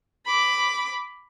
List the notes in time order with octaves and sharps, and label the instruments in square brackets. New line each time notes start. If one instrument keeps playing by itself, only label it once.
[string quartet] B5 D6